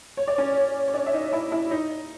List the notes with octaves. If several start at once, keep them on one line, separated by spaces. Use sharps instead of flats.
C#5
D5
C#4 C#5
C#5
D4 D5
E5
D#4 D#5
E4 E5
E4 E5
D#4 D#5